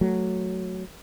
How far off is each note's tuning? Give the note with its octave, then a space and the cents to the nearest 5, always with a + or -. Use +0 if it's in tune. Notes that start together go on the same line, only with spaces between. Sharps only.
F#3 +0 A3 +0